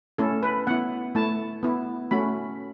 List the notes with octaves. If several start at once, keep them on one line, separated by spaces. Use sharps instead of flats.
A3 C#4 E4 A4
B4
B3 E4 F#5
A3 E4 A5
B3 E4
A3 C#4 F#4 B5